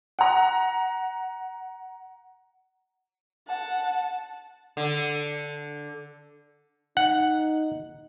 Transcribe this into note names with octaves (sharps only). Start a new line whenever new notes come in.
F#5 A#5
F#5 A5
D3
D#4 F#5